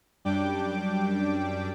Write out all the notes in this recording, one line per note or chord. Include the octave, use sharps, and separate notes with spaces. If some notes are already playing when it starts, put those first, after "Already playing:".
F#2 G3 D4 G5 D6